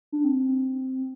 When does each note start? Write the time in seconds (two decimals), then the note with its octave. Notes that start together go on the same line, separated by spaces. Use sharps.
0.12 D4
0.24 C4